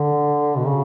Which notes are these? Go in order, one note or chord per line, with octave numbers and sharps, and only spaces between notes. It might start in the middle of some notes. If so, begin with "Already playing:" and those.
Already playing: D3
B2
C#3